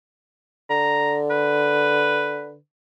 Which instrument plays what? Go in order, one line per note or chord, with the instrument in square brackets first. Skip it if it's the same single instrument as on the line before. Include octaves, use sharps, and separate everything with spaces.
[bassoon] D3 [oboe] A#5
[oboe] B4